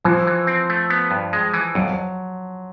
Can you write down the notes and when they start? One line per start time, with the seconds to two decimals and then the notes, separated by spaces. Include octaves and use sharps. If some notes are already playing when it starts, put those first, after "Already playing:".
0.05 E3 F3
0.27 E3
0.47 C4
0.69 A3
0.90 B3
1.11 G2
1.33 G#3
1.53 E3
1.75 F2 F#3